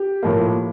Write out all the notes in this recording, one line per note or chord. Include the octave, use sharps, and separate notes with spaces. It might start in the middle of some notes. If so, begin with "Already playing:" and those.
Already playing: G4
A2 F3 A#3